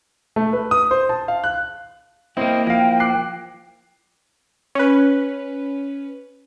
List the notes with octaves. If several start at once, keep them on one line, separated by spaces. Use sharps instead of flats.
A3
B4
D#6
C5
A5
F5
F#6
A#3 C4 E4 D#5 G5
F3 F5 A#6
D6 F#6 C7
C#4 B4